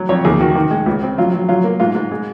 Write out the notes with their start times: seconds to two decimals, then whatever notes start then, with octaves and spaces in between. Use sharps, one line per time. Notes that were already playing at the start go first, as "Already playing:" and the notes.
Already playing: F#3
0.09 F2 C#5
0.25 D#2 G#4
0.40 D#3 F#4
0.55 D#3
0.71 G#3
0.86 C#2
1.02 C4
1.18 F#3 F4
1.34 F#3
1.49 F#3 F4
1.64 A#3
1.80 G#2 F4
1.95 G#2
2.11 G#3